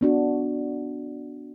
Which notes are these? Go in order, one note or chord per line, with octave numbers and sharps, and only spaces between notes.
B3 D4 F#4